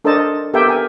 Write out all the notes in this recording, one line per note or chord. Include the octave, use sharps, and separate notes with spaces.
D4 A4 A#4 C5 D#5 A5
B3 G4 A4 A#4 E5 G5
A#4 G#5